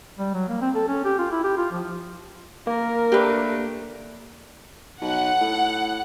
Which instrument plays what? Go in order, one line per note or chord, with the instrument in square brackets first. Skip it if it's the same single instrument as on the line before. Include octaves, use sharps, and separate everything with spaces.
[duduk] G3
F#3
A#3
C4
A4
C#4
G4
F4
E4
G4
F4
F3
[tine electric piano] A#3 [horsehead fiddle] A#4
[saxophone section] A3 D4 [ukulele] G4 B4
[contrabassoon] B1 [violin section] F#5
[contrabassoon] A2